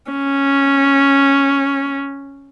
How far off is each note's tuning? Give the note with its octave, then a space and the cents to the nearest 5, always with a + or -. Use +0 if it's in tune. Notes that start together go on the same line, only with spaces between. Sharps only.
C#4 -5